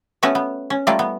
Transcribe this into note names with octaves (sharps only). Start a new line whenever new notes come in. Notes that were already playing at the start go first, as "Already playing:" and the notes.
A3 B3 C#4 F#4 B4
B3
C#4
G3 A3 A#3 F4 D5
B3